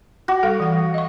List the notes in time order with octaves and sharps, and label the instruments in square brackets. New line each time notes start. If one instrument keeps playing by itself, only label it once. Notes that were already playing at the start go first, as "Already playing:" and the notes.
[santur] F#4 [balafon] D6
[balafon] G3 A4 F5
E3 F#5
D#5 C#6